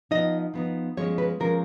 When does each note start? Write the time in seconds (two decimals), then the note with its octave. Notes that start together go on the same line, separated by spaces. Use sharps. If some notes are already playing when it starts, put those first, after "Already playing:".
0.11 F3 B3 D#4 D#5
0.54 F3 B3 D#4
0.97 F3 G#3 C#4 C#5
1.18 B4
1.40 F3 G#3 C#4 A#4